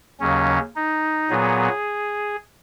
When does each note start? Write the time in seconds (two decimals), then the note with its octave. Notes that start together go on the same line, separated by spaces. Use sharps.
0.20 D#2 C#3 F#3 C#4
0.76 D#4
1.30 A#2 F#3 B3 G#4